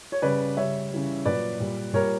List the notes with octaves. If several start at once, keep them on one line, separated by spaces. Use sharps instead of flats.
C#5
C#3 G3 B4 D5
C#3 G3 C#5 E5
C#3 E3 G3
A#2 F#3 B4 D5
A#2 G3
A#2 G3 A#4 C#5